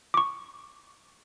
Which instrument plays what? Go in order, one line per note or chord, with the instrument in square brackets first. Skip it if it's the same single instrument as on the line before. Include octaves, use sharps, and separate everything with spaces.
[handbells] C#6 D6